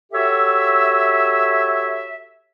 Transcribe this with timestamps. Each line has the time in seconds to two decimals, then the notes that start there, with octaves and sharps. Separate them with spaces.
0.12 F#4 G4 A4 C#5 E5